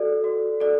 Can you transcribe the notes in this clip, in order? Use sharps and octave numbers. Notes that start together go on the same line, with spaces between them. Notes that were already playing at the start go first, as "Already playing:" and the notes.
Already playing: F#4 A4 D5
F#4
A4 D5